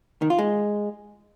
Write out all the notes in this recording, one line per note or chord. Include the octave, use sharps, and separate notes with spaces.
D#3
F4
G#3